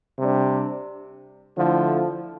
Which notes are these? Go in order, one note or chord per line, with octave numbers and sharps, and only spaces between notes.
C3 G3 D4
D3 F3 A3 E4